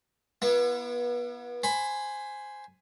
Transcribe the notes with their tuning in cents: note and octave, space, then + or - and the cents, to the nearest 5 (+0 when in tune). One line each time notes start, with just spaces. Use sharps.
B3 -30 E4 +35
C5 +0 G#5 +0 B5 +15